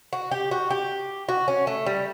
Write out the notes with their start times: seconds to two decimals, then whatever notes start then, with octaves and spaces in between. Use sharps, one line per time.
0.13 F#4
0.31 G4
0.51 F#4
0.70 G4
1.29 F#4
1.48 C#4
1.67 A3
1.86 G3